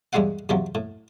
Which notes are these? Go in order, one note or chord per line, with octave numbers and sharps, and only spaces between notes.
E2 G3 G#3 E4 F5 F#5
E2 C3 F3 F#3
A2